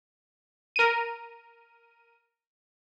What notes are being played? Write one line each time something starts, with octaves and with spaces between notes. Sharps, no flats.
A#4 D#7